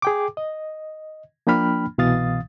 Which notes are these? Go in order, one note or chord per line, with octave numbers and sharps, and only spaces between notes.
G#4 G5 D6
D#5
F3 A#3 D4 G5 B5 F6
C2 B2 E3 F5 D#6 A6